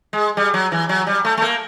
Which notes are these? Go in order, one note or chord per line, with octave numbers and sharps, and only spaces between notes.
G#3
G3
F#3
E3
F#3
G3
A3
A3
A#3